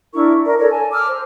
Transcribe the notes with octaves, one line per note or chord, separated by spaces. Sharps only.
D4 E4 A#4 C#6
A#4 D5
A4 C#5 D5
G#5 A5
D6 E6 F6
C5